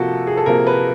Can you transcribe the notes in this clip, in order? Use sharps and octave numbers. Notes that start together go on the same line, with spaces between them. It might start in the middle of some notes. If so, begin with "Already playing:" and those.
Already playing: C3 F3 A#3 F#4 A4
G#4
A4
C3 F3 A#3 A#4
B4